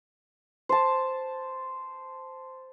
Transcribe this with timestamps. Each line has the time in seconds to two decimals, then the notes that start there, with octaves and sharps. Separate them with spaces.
0.69 C5 A5